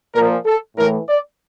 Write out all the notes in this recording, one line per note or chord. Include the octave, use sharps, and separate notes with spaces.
A#2 F3 A#4
A4
A2 E3 A#4
D5